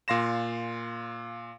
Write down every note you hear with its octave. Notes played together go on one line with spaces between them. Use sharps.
A#2 F5 C6 A#6 E7